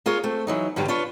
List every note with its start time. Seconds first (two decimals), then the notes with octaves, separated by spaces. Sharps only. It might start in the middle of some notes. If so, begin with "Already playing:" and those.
0.06 A#3 F4 G#4 C#5
0.23 A3 C4
0.47 E3 F#3 D#4
0.76 G2 D3 F#3 G3
0.88 D4 F4 B4 C#5